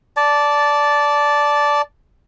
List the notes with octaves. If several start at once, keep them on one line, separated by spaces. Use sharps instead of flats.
D5 A5